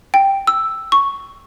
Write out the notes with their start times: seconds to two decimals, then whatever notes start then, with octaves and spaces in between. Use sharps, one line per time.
0.14 G5
0.47 E6
0.92 C#6